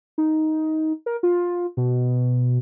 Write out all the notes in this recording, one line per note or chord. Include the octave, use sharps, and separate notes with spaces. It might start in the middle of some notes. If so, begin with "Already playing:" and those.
D#4
A#4
F4
B2